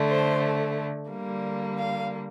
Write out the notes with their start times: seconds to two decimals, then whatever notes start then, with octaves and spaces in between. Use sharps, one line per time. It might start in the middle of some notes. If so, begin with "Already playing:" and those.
Already playing: D3 A3
0.10 C5
1.11 D3 G3 A#3
1.78 F5